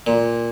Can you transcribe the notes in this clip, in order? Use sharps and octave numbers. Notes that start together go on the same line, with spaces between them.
A#2